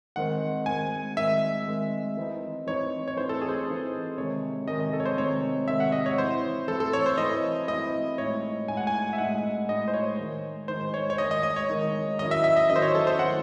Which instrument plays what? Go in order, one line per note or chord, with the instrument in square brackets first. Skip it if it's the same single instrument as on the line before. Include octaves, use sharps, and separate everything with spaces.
[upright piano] D#3 G#3 C4 [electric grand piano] F#5
[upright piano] D#3 G#3 C4 [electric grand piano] G#5
[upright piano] D#3 G#3 C4 [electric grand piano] E5
[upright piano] D#3 G#3 C4
E3 C4 D#4
[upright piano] E3 C4 D#4 [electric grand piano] C#5
[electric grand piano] C#5
[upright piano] E3 C4 D#4 [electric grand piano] C5
[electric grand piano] A4
G#4
C5
A4
[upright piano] E3 C4 D#4
[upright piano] C3 D#3 G#3 [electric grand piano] C#5
[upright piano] C3 D#3 G#3 [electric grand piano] D#5
[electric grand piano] D#5
A4
C#5
C5
[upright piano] C3 D#3 G#3 [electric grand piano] C#5
[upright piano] C3 D#3 G#3 [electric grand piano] E5
[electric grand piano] F#5
D#5
C#5
[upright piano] E3 C4 E4 [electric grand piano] C5
[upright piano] E3 C4 E4 [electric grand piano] A4
[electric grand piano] A4
C#5
C5
[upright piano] E3 C4 E4 [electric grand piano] D#5
[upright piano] E3 C4 E4 [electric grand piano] D#5
[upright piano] A2 G#3 D#4 [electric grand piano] C#5
[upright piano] A2 G#3 D#4 [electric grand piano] G#5
[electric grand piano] F#5
G#5
E5
[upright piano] A2 G#3 D#4 [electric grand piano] F#5
[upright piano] A2 G#3 D#4 [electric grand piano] D#5
[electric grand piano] C5
C#5
[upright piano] D#3 G#3 D#4
[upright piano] D#3 G#3 D#4 [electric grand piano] C5
[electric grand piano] C#5
C#5
[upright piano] D#3 G#3 D#4 [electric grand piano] D#5
[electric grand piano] D#5
D#5
C#5
[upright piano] D#3 G#3 D#4
[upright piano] D#3 F#3 C#4 E4 [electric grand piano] D#5
[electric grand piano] E5
E5
D#5
[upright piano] D#3 F#3 C#4 E4 [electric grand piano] D#5
[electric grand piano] C5
C#5
A4
C5
[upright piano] D#3 F#3 C#4 E4 [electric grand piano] F#5